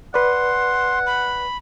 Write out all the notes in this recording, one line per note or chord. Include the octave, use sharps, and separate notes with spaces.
B4 D5 F#5 C6
B5